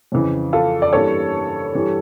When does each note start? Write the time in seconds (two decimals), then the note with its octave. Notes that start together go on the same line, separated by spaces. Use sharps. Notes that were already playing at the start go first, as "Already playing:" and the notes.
0.12 F2 C#3 E3
0.53 F4 A4
0.82 D5
0.93 G2 E3 A#3 A4 C#5
1.74 G2 E3 G3